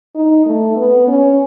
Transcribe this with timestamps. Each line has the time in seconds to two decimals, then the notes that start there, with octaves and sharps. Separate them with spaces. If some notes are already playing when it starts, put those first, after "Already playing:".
0.15 D#4
0.46 A3
0.76 B3
1.08 C#4